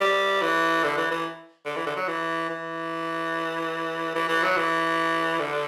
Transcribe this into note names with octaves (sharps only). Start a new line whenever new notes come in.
G3
E3
D3
E3
E3
D3
E3
D3
F#3
E3
E3
E3
E3
F#3
E3
D3